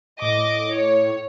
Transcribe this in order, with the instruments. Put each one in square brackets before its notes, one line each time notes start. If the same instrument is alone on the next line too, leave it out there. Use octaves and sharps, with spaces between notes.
[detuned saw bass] A2 [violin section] D#5 D6
[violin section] C#5